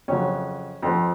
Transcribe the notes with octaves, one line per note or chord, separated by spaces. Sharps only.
F2 C#3 F#3 C#4
F2 F3